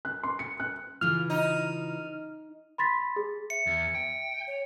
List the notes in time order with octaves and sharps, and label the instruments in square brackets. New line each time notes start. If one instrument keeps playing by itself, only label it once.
[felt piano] F#6
C6
C#7
F#6
[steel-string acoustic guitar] C#3 E3 F4 [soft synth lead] F6
[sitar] D#4
[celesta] B5 C6 A6 B6
G#4
[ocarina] E5 [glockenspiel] C#7
[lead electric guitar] E2
G5
[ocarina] C#5